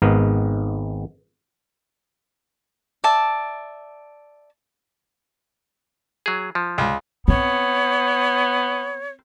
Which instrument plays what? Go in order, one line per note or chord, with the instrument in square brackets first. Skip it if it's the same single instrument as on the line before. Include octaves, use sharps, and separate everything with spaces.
[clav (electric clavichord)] G#1 G#2 B3 A#4
[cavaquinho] D5 E5 A5
[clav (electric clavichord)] F#3 G#4
F3
[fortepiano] C#2
[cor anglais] B3 [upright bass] C4 [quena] C#5